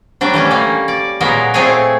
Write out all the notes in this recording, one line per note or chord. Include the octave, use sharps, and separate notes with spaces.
F#3 G3 D4
E3 A3 C#4
G3 A#3
D5
A#2 F#3 G#3 B3 A#4
A#2 A3 C4 G#4 C#5 G#5